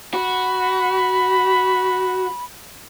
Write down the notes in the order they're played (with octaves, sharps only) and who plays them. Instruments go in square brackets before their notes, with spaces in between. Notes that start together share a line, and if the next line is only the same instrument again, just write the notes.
[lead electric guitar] F#4 [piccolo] B5